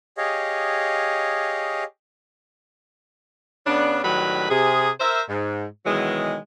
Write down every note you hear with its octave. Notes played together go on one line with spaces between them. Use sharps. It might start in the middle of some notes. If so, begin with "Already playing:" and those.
G4 G#4 C#5 D#5 F5
C#3 B3 C#4 D4
A2 D#3 F#3 G3 B4 B5
C3 G#4
A#4 C5 E5
G#2
B2 D#3 E3 F#3 G#3